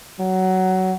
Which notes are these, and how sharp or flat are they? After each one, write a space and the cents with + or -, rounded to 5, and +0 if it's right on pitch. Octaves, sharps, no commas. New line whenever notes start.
F#3 +15